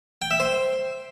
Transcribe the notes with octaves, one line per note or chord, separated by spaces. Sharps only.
G5
E5
C5